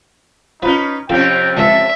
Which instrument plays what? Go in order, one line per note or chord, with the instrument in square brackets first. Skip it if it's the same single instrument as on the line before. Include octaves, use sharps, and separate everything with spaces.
[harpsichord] F3 F4 [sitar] C#4 B4 [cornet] D#4
[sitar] F2 C3 C#4 [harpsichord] F4 A4 [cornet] G5
[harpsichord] C#2 E3 [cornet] A4 [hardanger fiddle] E5